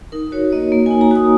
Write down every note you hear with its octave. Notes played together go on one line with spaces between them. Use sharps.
D#4 A#4
F#4 C#5
A#3 D#5
A#3
D#4 G#5
A#5
F#4 D#6